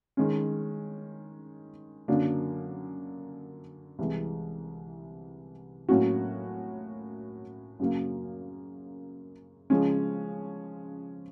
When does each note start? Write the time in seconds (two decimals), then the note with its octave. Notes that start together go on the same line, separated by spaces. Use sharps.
0.17 D#3 G#3 C#4
2.08 F#2 D3 F#3 A#3 D4
3.99 C2 C3 E3 G#3
5.89 A2 F#3 A#3 C#4 F#4
7.79 F#2 C#3 F#3 A#3
9.70 C#3 F3 G#3 C#4